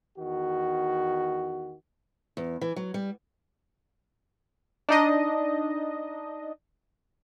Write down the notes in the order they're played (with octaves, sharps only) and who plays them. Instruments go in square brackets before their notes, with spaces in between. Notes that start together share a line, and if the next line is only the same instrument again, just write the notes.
[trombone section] E2 D#3 F#4
[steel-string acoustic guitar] E2
E3
F#3
G3
[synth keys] D4 D#4 D#5